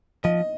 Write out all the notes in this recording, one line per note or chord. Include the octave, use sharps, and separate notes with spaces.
F3 D#5